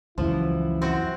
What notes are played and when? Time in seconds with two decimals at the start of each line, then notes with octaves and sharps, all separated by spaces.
0.18 C#2 F#2 E3 F3 E4
0.82 C4 F#4